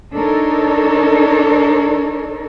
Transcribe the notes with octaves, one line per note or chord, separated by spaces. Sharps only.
D4 D#4 A4 A#4 C#5